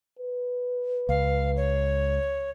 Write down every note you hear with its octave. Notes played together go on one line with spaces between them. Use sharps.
B4
C#2 F5
C#5